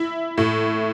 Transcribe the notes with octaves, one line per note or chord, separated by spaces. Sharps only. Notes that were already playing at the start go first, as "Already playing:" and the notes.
Already playing: E4
A2